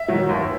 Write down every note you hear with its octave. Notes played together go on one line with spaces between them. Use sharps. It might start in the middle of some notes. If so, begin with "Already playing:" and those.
Already playing: E5
D#3 F#3
D#2